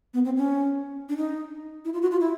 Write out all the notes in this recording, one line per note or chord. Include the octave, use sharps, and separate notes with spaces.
B3
C4
C#4
D4
D#4
E4
F4
F#4
F4
E4